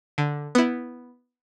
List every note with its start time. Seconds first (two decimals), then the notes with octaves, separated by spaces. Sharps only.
0.18 D3
0.55 B3 E4